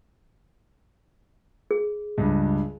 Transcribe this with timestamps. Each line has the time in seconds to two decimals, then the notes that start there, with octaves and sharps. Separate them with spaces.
1.71 G#4
2.18 C#2 G2